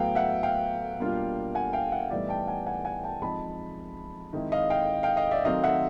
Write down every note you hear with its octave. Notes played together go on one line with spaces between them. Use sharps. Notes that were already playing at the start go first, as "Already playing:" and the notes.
Already playing: A2 F#3 B3 F5 G5
E5 F#5
F5 G5
B2 G3 A#3 D4 F4
F#5 G#5
F5 G5
E5 F#5
A2 E3 G3 B3 D#4 D5 E5
G5 A5
F#5 G#5
F#5 G#5
F#5 G#5
G5 A5
F3 G#3 C4 D#4 A5 B5
D#3 G#3 C4 E4
D#5 F5
F5 G5
F5 G5
D#5 F5
D5 E5
D#3 F#3 A3 C4 D#5 F5
E5 F#5